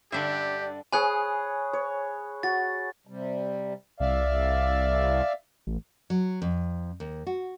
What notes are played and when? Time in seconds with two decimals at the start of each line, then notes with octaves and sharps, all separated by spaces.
0.12 G2 D3 D4 G4 D5 E5
0.93 G#4 C#5 G#5 B5 D#6 F#6
1.73 C#5
2.43 F#4 A6
3.07 C3 G3
4.00 C2 D5 E5 F5
5.67 A1
6.10 F#3
6.42 F2
7.00 D#2
7.27 F#4